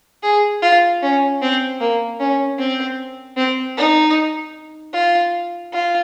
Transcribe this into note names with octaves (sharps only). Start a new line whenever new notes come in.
G#4
F4
C#4
C4
A#3
C#4
C4
C4
D#4
F4
F4